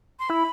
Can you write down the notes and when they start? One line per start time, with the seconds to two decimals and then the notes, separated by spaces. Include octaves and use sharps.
0.19 C6
0.29 E4 B5